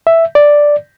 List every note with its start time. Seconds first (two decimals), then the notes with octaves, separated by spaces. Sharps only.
0.07 E5
0.35 D5